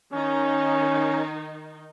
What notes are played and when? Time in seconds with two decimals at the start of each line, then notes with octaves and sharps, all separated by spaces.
0.13 D#3 C#4 D#4